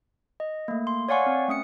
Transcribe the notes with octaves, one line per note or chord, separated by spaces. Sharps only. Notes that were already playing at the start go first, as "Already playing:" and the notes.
D#5
A3 A#3
C6
C#5 D5 F5 F#5 G#5 C#6
C4
A3 C#4 D#6 C#7